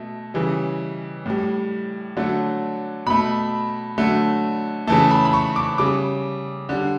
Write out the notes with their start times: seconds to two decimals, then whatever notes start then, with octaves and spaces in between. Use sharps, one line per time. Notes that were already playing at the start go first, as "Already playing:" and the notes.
Already playing: B2 A3
0.34 C#3 E3 G3
1.26 A2 G3
2.17 D3 F#3 A3
3.06 B2 A3 B5
3.98 D3 F#3 A3
4.87 C#3 E3 A3 A5
5.11 B5
5.25 B5
5.33 C#6
5.56 D6
5.78 C#3 G3 D6
6.69 D3 G3